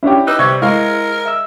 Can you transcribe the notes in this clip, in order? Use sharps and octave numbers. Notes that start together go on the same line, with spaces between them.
C#4 D4 E4 G4 C#5
D#4 B4 E6 F#6
C3 G3 C#6 G#6
G#3 E4 A#4 F5
E5 E6